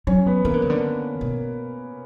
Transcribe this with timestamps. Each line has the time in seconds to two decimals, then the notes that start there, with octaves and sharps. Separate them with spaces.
0.07 F#3 C#4 C#5
0.26 B3 B4
0.45 E3 A#3 A#4
0.54 D3
0.62 C#3
0.70 D3
1.21 B2